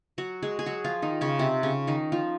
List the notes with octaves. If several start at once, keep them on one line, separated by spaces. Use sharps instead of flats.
F#3 F#4
G#3 G#4
G#4
F#3 F#4
F3 F4
D#3 D#4
C#3 C#4
C3 C4
C#3 C#4
D#3 D#4
F3 F4